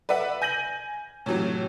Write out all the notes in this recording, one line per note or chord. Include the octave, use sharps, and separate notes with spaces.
B4 D5 E5 F#5
G#5 G6 A#6 D#7 F#7
A2 C3 E3 F#3